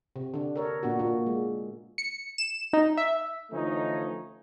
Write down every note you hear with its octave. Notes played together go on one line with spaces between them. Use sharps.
C3
D3 D4
A4 A#4 C#5
A#2 B3 D4 F#4
A#2 A#3
G#3
C#7
E7
D#4
E5
D3 E3 F3 A3 C#4 D#4